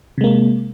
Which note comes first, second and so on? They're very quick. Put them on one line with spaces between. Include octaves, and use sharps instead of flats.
C3 G#3 A#3